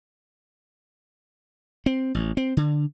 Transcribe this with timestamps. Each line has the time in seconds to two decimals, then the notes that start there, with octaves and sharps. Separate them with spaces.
1.86 C4
2.15 A1
2.37 C4
2.57 D3